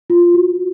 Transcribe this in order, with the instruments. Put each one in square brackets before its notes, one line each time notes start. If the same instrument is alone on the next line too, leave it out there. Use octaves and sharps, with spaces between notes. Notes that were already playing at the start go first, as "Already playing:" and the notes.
[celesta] F4
F#4